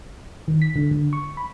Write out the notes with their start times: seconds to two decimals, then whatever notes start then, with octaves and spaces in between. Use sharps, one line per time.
0.48 D#3
0.62 B6
0.76 D3
0.91 D3
1.13 C#6
1.37 B5